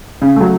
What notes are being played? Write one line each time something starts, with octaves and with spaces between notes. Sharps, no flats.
C#3
F#3 A3